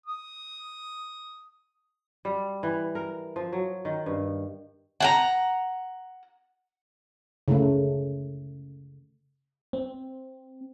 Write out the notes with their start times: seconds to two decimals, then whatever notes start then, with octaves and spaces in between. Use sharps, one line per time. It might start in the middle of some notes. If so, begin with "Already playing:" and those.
0.06 D#6
2.25 G3
2.63 E3
2.95 A#4
3.36 F3
3.53 F#3
3.85 D#3
4.06 G2
5.00 F#5 G5 A#5
7.48 C#3 A3
9.73 C4